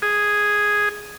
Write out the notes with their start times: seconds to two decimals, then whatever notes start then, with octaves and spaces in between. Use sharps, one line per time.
0.02 G#4